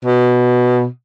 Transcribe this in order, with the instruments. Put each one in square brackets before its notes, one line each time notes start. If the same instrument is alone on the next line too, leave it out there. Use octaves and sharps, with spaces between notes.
[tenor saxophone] B2